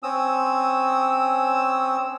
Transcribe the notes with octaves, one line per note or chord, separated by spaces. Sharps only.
C4 C#4 D#6 E6